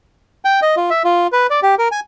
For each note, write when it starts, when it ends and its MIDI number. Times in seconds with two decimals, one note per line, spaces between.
0.45 0.60 79
0.62 0.75 75
0.77 0.90 65
0.90 1.03 76
1.04 1.27 65
1.32 1.47 71
1.50 1.60 74
1.63 1.75 67
1.78 1.88 70
1.92 2.00 80